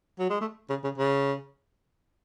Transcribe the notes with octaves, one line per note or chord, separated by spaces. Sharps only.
F#3
G#3
A3
C#3
C#3
C#3